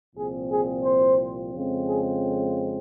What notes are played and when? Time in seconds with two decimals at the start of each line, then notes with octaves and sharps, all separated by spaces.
0.16 C2 A#2 F3 C4 G#4
0.50 G#4
0.84 C5
1.53 F2 C#3 G#3 C4
1.87 G#4